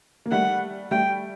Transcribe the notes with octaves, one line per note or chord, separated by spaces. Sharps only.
A#3
G3 A3 F#5
G3 A3 G5